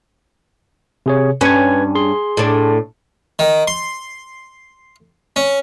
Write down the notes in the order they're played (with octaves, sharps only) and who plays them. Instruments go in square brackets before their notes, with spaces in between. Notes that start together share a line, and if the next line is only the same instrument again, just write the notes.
[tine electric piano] C3 G#4 C#5
[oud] G2 C#4 [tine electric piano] B4 G#5 G#6
[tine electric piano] G#4 C6
[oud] A2 D4
[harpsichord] D#3
C6
C#4